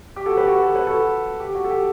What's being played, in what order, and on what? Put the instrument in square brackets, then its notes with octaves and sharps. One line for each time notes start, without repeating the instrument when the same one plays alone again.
[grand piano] G4
F#4 A4
G4 B4
F#4 A4
A4
B4
F#4 A4
G4
F#4
A4
G4